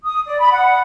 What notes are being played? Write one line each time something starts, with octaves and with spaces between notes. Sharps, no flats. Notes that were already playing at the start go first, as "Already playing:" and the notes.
D#6
D5
B5
F#5